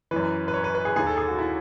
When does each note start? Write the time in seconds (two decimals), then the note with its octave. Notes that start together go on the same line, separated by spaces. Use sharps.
0.11 F#2 E3 B4
0.48 B4
0.54 C#5
0.64 B4
0.75 B4
0.85 G#4
0.96 D#2 D#3 G#4
1.07 A4
1.17 G#4
1.28 F#4
1.39 E4